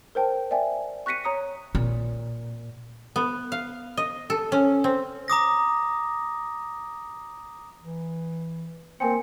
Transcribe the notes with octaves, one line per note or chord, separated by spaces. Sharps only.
A#4 C5 G5 A5
D5 E5 G5 G#5
C#6 F#6 A#6 B6 C#7 D#7
C#5 A#5 D#6 C#7
A#2
B3
F5
D#5
A4
C#4
C4
A#5 D6 D#6 A#6
E3
A#3 C4 A#4 G#5 C#7